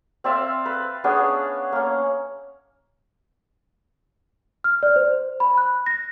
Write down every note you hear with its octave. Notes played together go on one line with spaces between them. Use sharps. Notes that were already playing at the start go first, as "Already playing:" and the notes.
C4 D5 E5 F5
B4
B3 C#4 D4 G#4
A#3 C#4
F6
D5
C5
B5
F#6
A#6